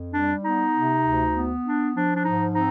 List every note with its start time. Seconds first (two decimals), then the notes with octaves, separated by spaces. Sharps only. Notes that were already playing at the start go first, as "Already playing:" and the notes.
Already playing: F2
0.14 G3 D4
0.44 B3 D#4
0.74 C3
1.04 D2
1.34 B3
1.65 D4
1.94 F3 D4
2.16 D4
2.24 G#2 D#4
2.54 C4 D#4